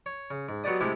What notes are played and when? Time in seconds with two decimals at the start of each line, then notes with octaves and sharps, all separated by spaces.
0.06 C#5
0.31 C#3
0.49 G#2
0.64 F#3 B3 F#4 G4 D5 D#5
0.80 C3 G#3 A3 E4 G4 C5